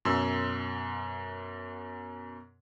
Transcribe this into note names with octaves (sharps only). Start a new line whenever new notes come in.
F#2 B2 C6 E6